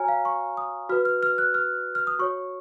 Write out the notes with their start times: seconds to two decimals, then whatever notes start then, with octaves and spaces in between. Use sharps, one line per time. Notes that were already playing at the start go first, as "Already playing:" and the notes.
Already playing: F#4 C#5 G#5 A#5 F6
0.08 F5
0.25 C#6
0.57 D#6
0.89 F#4 B4 F6
1.05 F6
1.23 F6
1.38 F#6
1.54 F6
1.95 F6
2.07 D#6
2.19 F#4 C#5 C#6